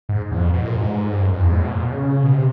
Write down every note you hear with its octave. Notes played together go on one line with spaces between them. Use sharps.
G#2
E2
F2
B2
A2
A#2
G2
G#2
G2
F#2
F2
E2
G#2
A2
B2
A#2
B2
C#3
B2
C3